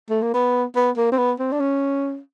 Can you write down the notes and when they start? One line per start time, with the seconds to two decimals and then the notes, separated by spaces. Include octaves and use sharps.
0.10 A3
0.22 A#3
0.34 B3
0.76 B3
0.97 A#3
1.12 C4
1.18 B3
1.40 C4
1.52 D4
1.60 C#4